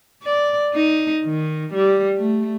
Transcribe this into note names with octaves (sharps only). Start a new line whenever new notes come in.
D5
D#4
D#3
G3
A3